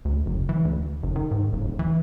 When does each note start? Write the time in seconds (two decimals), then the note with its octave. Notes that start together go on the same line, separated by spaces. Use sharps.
0.05 D2
0.26 F#1
0.49 E3
0.65 D2
1.03 F#1
1.16 D#3
1.31 G#2
1.53 D#1
1.65 D#1
1.79 E3